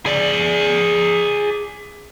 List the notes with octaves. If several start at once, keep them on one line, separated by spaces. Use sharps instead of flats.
G#4 D5